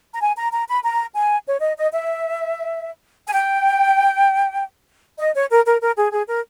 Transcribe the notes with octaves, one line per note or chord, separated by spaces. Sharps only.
A#5
G#5
A#5
A#5
B5
A#5
G#5
C#5
D#5
D#5
E5
G#5
G5
D#5
C#5
A#4
A#4
A#4
G#4
G#4
A#4